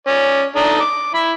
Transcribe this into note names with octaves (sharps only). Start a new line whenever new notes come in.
C#4 D5
D4 D#4 A4
D6
E4 B5